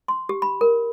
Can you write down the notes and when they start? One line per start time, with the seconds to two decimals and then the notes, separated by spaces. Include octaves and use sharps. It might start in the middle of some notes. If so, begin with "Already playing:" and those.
0.08 C6
0.29 G4
0.42 B5
0.61 A#4